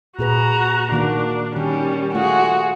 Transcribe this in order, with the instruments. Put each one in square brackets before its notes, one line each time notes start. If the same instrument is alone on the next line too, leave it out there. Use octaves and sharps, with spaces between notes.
[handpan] A#2 G#4 B4 [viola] F#4 A#5
[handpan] D#3 A#3 F#4 [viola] D4
[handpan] D#3 [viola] G3 [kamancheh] C#4
[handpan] A3 F4 [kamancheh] F#4 G#4